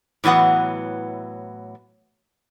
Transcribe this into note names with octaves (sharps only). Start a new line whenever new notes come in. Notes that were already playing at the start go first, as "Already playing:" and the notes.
A2 E3 F#3 B3 F#5